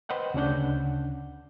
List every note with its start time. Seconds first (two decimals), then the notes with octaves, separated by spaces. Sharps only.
0.09 B4 C5 D#5 F#5 G5
0.34 D2 C#3 C#4 D4 F#5 G6